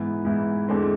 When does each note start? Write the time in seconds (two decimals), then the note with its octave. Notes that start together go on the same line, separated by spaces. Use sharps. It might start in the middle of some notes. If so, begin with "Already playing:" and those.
Already playing: G#2 E3 B3 E4
0.25 G#2 E3 B3 E4
0.68 E2 D3 G#3 C4